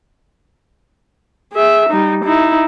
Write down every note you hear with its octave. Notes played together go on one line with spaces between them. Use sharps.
G#4 E5
G3 D#4
D#4 E4